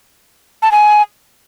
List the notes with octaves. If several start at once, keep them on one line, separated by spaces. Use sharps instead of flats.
A5
G#5